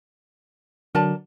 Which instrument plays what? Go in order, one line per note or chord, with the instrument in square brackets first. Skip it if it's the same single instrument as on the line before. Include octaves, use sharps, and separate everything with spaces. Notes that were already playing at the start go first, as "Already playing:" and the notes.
[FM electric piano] D3 F#3 [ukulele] A#4 D5 A5